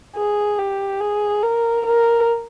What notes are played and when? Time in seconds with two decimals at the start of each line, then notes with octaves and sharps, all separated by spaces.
0.16 G#4
0.59 G4
1.01 G#4
1.43 A#4
1.86 A#4